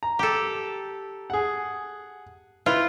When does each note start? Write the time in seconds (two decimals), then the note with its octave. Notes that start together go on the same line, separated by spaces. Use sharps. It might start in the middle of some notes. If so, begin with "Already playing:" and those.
0.03 A#5
0.19 G4 A4
1.30 G#4 F#5
2.66 E4 F4 B4 C6